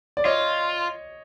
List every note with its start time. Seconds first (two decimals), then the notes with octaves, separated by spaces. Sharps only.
0.17 D5
0.25 F4 C#5 D#5